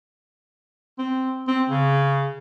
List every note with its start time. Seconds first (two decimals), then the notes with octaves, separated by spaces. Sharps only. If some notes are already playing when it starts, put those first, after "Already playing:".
0.98 C4
1.48 C4
1.69 C#3